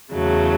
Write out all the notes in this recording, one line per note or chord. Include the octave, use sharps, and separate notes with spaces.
E2 C#3 F#3 A3